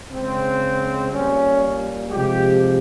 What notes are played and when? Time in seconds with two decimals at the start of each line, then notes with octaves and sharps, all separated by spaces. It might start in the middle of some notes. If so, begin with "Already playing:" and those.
0.11 C#3 G#3 C4
1.11 A#2 G3 C#4
2.10 C3 F3 G#3 G4